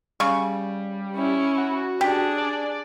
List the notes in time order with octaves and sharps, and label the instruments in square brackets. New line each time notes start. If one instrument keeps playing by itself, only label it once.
[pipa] C#3 C#6 [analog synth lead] G3
[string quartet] C#4 E4
[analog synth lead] F#4
[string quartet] D4 G#4 [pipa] G4
[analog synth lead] D5